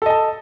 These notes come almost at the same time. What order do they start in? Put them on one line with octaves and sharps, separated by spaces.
A4 D#5 A5